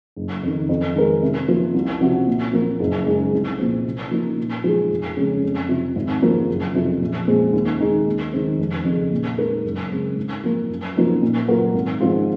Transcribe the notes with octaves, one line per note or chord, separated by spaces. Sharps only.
F#1
F2 D#3
F2
D#3 G#3 D#4 A#4
C3
F3 A#3
C2
C3 F3 C4 F#4
A#2
F3 A#3
F#1
F#2 C#3 G#3 D#4
C2
A#2 F3 C4
C3
F3 A#3 D#4
A#2
F3 G#3 D#4 G#4
F1
F2 C#3 G#3 C#4
F2
C3 F3
G#1
G#2 F3 A#3
F#1
F2 C3 F3
A#1
A#2 G#3 C4
D#2
D#3 G#3 D#4
D#2
D#3 G#3 C4
F1
F2 C#3
A#2
G#3 D#4 A#4
F#1
F#2 C#3 G#3 C4
G#2
F3 A#3
F#2
F3 A#3 D#4 F#4
A#2
F#3 A#3 F4 A#4
G#1
G#2 F3 C4 F4